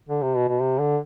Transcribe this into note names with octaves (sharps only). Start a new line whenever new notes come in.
D3
C3
B2
B2
C3
D3